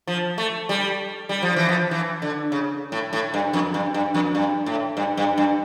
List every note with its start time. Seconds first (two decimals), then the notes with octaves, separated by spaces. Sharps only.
0.07 F3
0.38 A3
0.69 G3
1.29 G3
1.42 F3
1.56 E3
1.69 F3
1.91 E3
2.22 D3
2.52 C#3
2.92 A2
3.13 A2
3.34 G2
3.53 F2
3.74 G2
3.94 G2
4.14 F2
4.35 G2
4.66 A2
4.97 G2
5.17 G2
5.38 G2